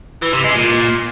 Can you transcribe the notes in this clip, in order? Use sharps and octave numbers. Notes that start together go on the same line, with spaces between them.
E3
C3
G#3
A#2